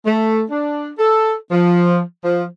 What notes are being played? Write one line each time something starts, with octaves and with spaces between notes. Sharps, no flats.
A3
D4
A4
F3
F3